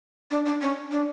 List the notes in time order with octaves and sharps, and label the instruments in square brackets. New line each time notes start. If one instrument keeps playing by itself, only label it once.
[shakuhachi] D4
D4
C#4
D4